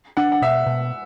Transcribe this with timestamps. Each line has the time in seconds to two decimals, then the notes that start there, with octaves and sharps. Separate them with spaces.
0.17 D4 F#5
0.32 F#5
0.42 B2 E5
0.66 B2